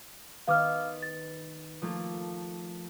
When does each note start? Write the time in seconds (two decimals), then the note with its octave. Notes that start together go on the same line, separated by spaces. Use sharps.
0.47 D#3 B3 F5 D6 F6
1.02 A6
1.82 F3 A3 A#3